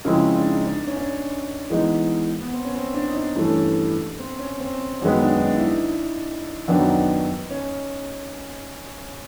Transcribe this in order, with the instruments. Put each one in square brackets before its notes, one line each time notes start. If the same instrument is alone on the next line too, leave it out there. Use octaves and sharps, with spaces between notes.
[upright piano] C#3 F3 G#3 C4 E4 [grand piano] A#4
[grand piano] D4
D#4
D4
C#4
D4
C#4
[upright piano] E3 G#3 B3 D#4
[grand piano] B3
C4
C#4
C4
D4
D#4
D4
[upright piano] G2 E3 A3 C#4
[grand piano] C4
C#4
C4
[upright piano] F#2 D#3 G#3 B3 [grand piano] C#4
[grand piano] D4
D#4
D4
E4
D#4
[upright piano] F#2 D#3 F#3 B3 D4 [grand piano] D#4
[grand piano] C#4